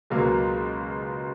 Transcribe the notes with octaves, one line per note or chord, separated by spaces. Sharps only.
C#2 B2 F#3 A#3